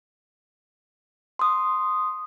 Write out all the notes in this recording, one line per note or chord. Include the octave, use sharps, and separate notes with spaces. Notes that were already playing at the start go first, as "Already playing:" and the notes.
C6 D#6